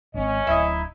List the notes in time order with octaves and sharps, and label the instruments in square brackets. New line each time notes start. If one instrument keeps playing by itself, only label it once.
[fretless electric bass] G#1 C4 [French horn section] C#4 D#5
[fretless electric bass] D1 [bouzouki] D#4 E4